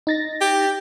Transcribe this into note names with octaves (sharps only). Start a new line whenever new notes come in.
D#4 A6 A#6
G4